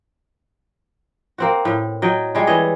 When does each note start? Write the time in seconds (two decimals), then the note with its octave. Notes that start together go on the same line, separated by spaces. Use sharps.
1.38 A#3 C4 F#4
1.65 A2
2.02 F#3 D#5 G5
2.35 G3 G#3
2.47 E3 C#5 D#5